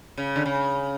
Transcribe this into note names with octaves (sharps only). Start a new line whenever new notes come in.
C#3
D3
C#3